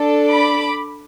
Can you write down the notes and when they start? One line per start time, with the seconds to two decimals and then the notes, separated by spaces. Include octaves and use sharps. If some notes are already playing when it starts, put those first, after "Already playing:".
Already playing: D4 A4
0.32 B5 D6